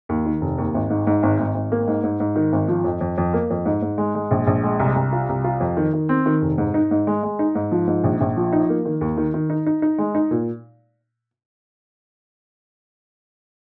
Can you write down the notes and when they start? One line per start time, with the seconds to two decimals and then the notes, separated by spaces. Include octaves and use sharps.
0.09 D#2
0.26 D#3
0.41 F1
0.58 D#2
0.74 G#1
0.90 G#2
1.07 G#2
1.23 G#1
1.39 G#1
1.55 G#1
1.72 A#3
1.88 G#2
2.04 G#2
2.20 G#2
2.36 D#3
2.53 G#1
2.68 F3
2.84 F2
3.01 F2
3.18 F2
3.33 A#3
3.50 F2
3.66 G#2
3.82 G#2
3.98 G#3
4.15 G#3
4.31 A#1
4.47 A#1
4.64 G#3
4.79 C2
4.95 C2
5.13 F4
5.29 C2
5.44 F4
5.60 F2
5.77 D#3
5.94 D#3
6.09 C4
6.26 D#3
6.42 F1
6.58 G#2
6.74 D#4
6.91 G#2
7.07 G#3
7.23 G#3
7.39 D#4
7.55 G#2
7.72 F3
7.87 G#2
8.04 A#1
8.21 A#1
8.37 F3
8.53 D#4
8.69 A#3
8.85 D#3
9.01 D#2
9.17 D#3
9.34 D#3
9.50 D#4
9.66 D#4
9.82 D#4
9.98 G#3
10.15 D#4
10.31 A#2